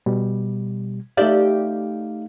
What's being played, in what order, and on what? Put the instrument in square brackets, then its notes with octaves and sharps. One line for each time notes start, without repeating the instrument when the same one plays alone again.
[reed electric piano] B2 G3
[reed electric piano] A3 D#4 F5 [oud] G4 D5 E5